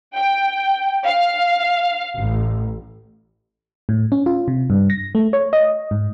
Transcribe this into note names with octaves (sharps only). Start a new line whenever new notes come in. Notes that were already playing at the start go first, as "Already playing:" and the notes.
G5
F5
A1
A2
C#4
F4
C3
G2
A#6
A3
C#5
D#5
G#2